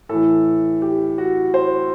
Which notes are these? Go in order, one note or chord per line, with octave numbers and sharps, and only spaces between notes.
A2 E3 A4
G4
F#4
C5